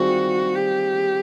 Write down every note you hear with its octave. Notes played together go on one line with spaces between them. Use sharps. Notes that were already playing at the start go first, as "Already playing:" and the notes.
Already playing: D#3 G3 C4 F4 F#4 G#4
G4